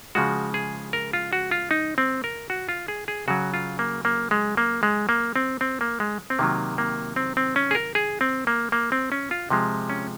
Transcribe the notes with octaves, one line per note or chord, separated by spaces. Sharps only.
C#3 F3 G#3 F#4
G#4
A#4
F4
F#4
F4
D#4
C4
A#4
F#4
F4
G#4
G#4
C#3 F#3 F#4
F4
A#3
A#3
G#3
A#3
G#3
A#3
C4
C4
A#3
G#3
C4
C3 D#3 F#3 A#3
A#3
C4
C4
C#4
G#4
A#4
G#4
C4
A#3
A#3
C4
C#4
F4
C3 F3 G#3
C#4